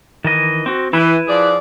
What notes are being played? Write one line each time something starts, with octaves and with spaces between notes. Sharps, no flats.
D#3 E3 D#5
C4 F#4
E3 E4 B4
F3 G#4 D5